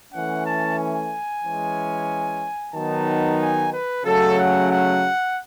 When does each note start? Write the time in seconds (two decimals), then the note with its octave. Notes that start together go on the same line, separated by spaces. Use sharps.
0.12 E3 A3 C#4 F#5
0.45 A5
0.78 G#5
1.43 E3 G#3 C#4
2.74 D#3 F#3 B3 D#4 A5
3.39 G#5
3.72 B4
4.04 C#3 F#3 A3 C#4 A4
4.37 F#5
4.70 F#5